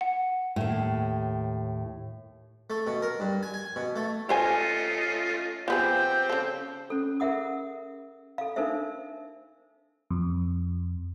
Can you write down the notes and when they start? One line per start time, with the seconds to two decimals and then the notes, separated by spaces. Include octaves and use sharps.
0.01 F#5
0.56 D#2 A2
2.70 A3
2.87 B2
3.02 A#4
3.20 G2
3.43 G#5
3.54 G#5
3.76 B2
3.96 A3
4.29 A3 C#4 F4 A4 C5 D#5 G#5
5.68 F3 B3 C4 G4 G#4 G6
6.30 C#3 A4
6.90 C#4 A4
7.20 G#4 A#4 E5 F#5 D#6
8.38 A4 F5
8.56 D4 D#4 A4 A#4 C5 E5
10.10 F2